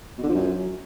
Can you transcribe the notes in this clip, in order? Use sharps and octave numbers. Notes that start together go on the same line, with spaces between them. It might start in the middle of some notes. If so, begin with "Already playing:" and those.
B2
D3
F3
F#2